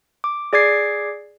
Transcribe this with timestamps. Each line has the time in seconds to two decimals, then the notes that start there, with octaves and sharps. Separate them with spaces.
0.24 D6
0.53 G#4 D5 D6 G#6 C7